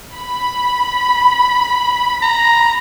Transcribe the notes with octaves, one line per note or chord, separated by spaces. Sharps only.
B5
A#5